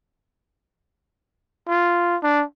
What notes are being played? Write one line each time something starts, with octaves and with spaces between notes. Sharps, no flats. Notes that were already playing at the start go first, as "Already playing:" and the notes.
F4
D4